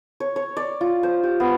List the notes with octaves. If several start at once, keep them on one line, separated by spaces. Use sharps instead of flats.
C#5
C#5
D5
F4
C5
G4
B3